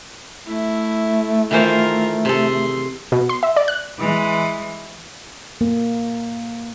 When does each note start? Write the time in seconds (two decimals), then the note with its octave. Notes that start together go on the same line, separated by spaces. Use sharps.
0.47 A3 E4
1.51 D#3 E3 F4 A#4 C5
2.25 C3 G#4 A4 C6
3.12 B2
3.29 C6
3.43 E5
3.56 D5
3.68 F#6
3.99 E3 G#3
5.61 A#3